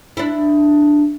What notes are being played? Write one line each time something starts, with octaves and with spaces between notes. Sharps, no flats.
D4 E4